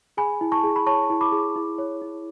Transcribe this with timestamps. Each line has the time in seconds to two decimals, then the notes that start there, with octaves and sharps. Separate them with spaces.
0.17 G#4 G#5 B5
0.41 E4
0.52 A5 C#6
0.64 G#4
0.76 B5
0.86 C#5 A5 C#6
1.10 E4
1.21 B5 D6
1.32 G#4
1.56 E4
1.78 C#5
2.02 E4